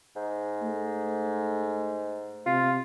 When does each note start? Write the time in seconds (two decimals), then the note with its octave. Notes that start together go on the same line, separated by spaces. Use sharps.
0.16 G#2
0.62 A3
2.46 C3 F4